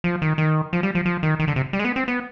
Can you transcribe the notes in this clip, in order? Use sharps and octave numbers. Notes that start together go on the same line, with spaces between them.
F3
D#3
D#3
F3
G3
F3
F3
D#3
D#3
D3
C3
G3
G#3
B3
C4
B3